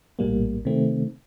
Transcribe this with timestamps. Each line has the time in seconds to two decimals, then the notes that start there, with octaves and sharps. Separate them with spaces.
0.19 A#1 A2 G3 A#3
0.65 C3 D#3 A3 C4